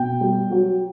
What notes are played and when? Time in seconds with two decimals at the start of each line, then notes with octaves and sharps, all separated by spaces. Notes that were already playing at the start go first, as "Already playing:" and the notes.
Already playing: B2 G5
0.21 G3
0.51 F#3